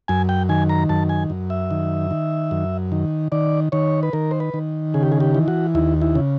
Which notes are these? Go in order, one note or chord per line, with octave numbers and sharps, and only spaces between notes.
F#2 G#5
G5
D#3 G#5
A#5
F#2 A5
G#5
F#2
E5
D#3
D#3
F#2
D#3
D#3 D5
D#3 C#5
B4
D#3 A#4
C5
B4
D#3
C#3 G#4
G4
G#4
G4
E3
F#4
D#2 E4
E4
C#3